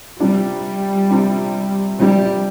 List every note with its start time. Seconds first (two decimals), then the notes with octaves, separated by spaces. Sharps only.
0.20 C3 F3 G3 D4
1.10 C3 F3 D4
2.00 C3 F3 G3 D4